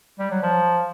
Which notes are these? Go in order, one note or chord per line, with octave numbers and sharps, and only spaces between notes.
G3
F#3
F3